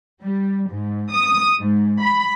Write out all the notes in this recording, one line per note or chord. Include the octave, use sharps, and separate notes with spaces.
G3
G#2
D#6
G#2
B5